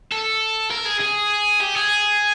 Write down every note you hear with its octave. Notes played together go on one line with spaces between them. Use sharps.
A4
A#4
G#4
G#4
G4
G#4